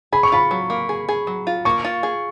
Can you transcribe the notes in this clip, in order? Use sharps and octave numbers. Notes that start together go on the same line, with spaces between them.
G#4 B5
C#6
F4 B5
F#3
A#3
G#4
G#4
F#3
F4
A#3 C#6
F4
G#4